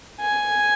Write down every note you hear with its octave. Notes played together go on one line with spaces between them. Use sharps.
G#5